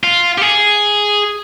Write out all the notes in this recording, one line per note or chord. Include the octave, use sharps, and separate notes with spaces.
F4
G4
G#4